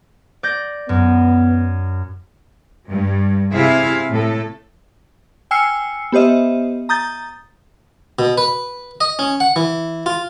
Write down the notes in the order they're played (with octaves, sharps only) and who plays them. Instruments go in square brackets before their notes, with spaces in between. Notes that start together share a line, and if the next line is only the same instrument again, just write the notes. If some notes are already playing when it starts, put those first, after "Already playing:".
[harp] D5 G6 A#6
[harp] F#2 [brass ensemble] B3
[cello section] G2
C3 E4 G#4 E5 F5
A2 A4
[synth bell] G5 G#5 E6 F6 C7 C#7
B3 G4 C5 D#5 E5
A#5 D#6 G6 A6
[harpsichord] B2
B4
D#5
C#4
F#5
E3
F4